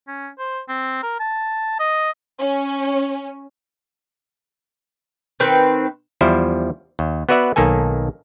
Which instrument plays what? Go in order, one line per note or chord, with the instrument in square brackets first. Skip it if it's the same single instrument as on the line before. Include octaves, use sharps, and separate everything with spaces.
[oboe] C#4
C5
C4
A#4
A5
D#5
[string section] C#4
[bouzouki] D#3 C4 B4
[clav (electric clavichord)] E2 F3 G3 E4 C5
D#2
B3 F#4 B4 D5 E5 F#5
B1 D#3 A#3 A4 G#5